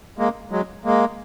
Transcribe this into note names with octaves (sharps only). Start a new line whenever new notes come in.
G#3 A#3
F#3 G#3
G#3 A#3